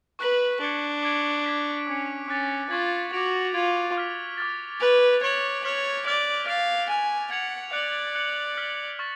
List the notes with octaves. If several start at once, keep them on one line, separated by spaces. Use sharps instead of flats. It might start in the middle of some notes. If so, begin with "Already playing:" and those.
B4 C#6 F#6 B6 F#7
D4 G#6 C#7 F#7
D6 G#6 D7
D6 G#6 B6 D7
C#4 D6 G#6 C#7
C#4 D6 F#6 A6
F4 C#6 G#6 B6 F#7
F#4 D6 G#6 D7 F7
F4 G#6 D7 F#7
D6 F6 B6
D6 F6 A6
B4 F#6 A6 D7 F7
C#5 G#6 D7 F#7
C#5 F6 B6 D7 F#7
D5 F6 B6 D7 F7
F5 F6 A6 D7 F7
G#5 F6 A6 F7
F#5 G#6 C#7 F7
D5 F#6 C#7 F#7
F#6 C#7 F#7
F6 B6 F#7
C#6 F6 A6